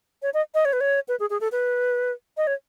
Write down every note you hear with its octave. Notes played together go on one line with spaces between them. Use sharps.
C#5
D#5
D#5
C#5
B4
C#5
B4
G#4
G#4
A4
B4
D#5
C#5